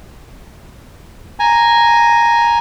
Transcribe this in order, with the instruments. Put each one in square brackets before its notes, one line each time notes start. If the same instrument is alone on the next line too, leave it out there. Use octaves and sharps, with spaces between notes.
[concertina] G#5 A#5